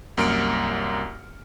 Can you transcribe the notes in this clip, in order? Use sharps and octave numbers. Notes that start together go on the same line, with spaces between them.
C2 F#2 A#3 F6 C#7 D7